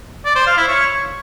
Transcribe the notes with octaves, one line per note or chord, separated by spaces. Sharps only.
D5
C5
F5
E4
C#5